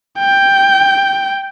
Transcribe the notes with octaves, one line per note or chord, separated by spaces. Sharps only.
G5